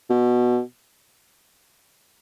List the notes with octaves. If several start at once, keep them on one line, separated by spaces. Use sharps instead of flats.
B2